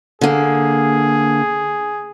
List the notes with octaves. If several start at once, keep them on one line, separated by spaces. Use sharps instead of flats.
D3 A#3 G#4